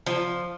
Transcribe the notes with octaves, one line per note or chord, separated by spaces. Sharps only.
F3